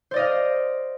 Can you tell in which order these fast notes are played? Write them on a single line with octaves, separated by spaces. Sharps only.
C5 D5 D#5 F5